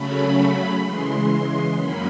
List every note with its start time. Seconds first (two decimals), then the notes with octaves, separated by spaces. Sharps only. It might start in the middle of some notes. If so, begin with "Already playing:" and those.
Already playing: C#3 F#3 A3 C#4 B5
0.36 B5
0.83 C#3 E3 G#3 C6
1.77 F#2 D#3 F#3 A#3 C#4 B5